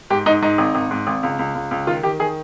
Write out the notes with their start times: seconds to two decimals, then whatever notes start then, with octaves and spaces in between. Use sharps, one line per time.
0.10 G#2 G4
0.26 G#2 D#4
0.42 G#2 D#4
0.58 G#1
0.75 G#1
0.91 G#2
1.07 G#1
1.23 C#2
1.39 C#2
1.55 C#2
1.71 C#2
1.87 D#3 F4
2.03 D#3 G4
2.19 D#3 G#4